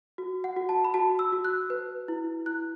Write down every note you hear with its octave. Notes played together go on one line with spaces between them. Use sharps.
F#4
F#5
F#4
A5
B5
F#4 A5
E6
F#4
F#6
B4
E4
E4 F#6